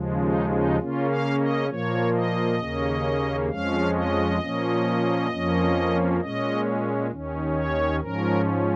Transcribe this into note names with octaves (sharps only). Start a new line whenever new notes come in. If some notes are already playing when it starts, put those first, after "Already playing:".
Already playing: D#2 C#3 F3 G#3
D#4
D#4
C#3 A#3 C#4 F4
F5
D#5
A#2 F3 A#3 C#5
D#5
D#2 C#3 A#3 C#4
F2 F3 G#3 C#4 F5
D#5
A#2 F3 A#3 C#4
F2 F3 A#3 C#4
A#2 G#3 C#4 D#5
D#2 D#3 C#4
C#5
G#2 F3 C#4 A#4